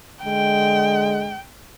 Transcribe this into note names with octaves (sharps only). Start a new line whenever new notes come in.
D3 G#3 G5